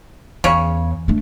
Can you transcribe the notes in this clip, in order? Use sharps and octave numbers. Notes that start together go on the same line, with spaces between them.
E2 C#3 C#5
A3 D4